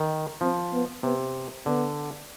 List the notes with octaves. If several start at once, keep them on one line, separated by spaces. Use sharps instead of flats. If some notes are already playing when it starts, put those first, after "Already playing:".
Already playing: D#3
F3 C4
B3
C3 B3
D3 B3